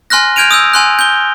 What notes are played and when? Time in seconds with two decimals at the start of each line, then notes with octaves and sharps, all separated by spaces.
0.10 G#5 C6 F6 F#6 A#6
0.36 F6 G6 G#6 D7 D#7 F7
0.51 D#6 E6 G6
0.73 G#5 C6 F#6
0.99 G6 G7